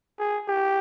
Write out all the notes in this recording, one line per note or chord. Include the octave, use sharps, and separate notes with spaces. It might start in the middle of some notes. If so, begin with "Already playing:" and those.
G#4
G4